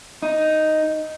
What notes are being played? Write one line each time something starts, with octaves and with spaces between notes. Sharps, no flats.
D#4